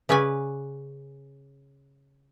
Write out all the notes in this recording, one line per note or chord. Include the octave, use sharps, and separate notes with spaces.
C#3 C#4 B4 D5 G#5